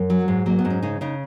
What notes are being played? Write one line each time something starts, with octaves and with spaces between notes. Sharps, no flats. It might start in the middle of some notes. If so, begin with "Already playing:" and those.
Already playing: F#2
F#3
G#2
F#3 A#3
B3
G#2
C#4
C#3 D#4
C#3 D#4